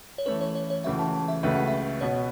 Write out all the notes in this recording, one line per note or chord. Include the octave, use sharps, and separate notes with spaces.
C#5
E3 A3 C#4 B4
C#5
C#5
C#5
C#2 C#3 E3 A3 F#4 E5
A5
A5
E5
C#2 C#3 A3 F#4 B4 E5
F#5
E5
B2 B3 F#4 C#5